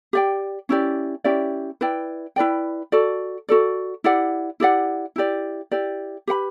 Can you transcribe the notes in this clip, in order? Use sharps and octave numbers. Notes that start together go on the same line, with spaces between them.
G4 D5 G5
C#4 E4 G4 D5
C#4 E4 G4 D5
E4 B4 D5 G5
E4 B4 D5 G5
F#4 A4 D5
F#4 A4 D5
E4 G4 D5 F#5
E4 G4 D5 F#5
E4 G4 D5
E4 G4 D5
G4 B4 F#5 B5